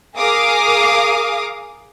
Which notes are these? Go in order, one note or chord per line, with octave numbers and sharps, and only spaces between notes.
G#4 A#4 F5 D6 D#6